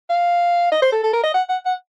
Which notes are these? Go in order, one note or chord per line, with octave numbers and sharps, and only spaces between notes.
F5
D#5
C5
A4
A4
A#4
D#5
F#5
F#5
F#5